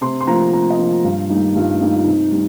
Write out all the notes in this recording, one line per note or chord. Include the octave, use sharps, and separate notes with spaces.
C3 C6
C6
F3 A#3 A#5
C3 A#5
D#5
F3 A#3
F4
G2 F4
G3 A#3 D#4
G2 F4
G3 A#3 D#4
F4
C3 D#4
G3